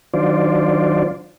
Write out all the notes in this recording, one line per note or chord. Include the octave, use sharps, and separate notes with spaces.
D#3 F#3 D4 F4 C5 D5